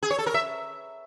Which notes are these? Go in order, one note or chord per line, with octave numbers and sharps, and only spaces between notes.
G#4
C#5
A4
A#4
E5